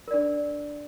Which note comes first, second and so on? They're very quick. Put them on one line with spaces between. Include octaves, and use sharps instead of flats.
A#4 D5 D4